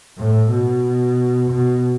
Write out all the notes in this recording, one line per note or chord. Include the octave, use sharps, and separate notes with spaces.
A2
B2
B2